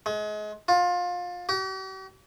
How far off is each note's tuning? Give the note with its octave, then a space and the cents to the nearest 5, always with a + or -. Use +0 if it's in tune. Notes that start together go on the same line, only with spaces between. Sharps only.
G#3 +30
F4 +25
G4 -45